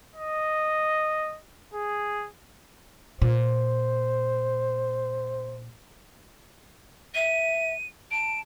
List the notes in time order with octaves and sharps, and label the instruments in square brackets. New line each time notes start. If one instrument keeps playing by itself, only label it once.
[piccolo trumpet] D#5
G#4
[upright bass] A#2 [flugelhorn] C5
[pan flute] E5 [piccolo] D#7
[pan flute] A5 [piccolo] D7